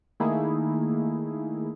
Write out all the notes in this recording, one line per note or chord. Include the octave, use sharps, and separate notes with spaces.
D#3 A3 A#3 D#4 E4 G#4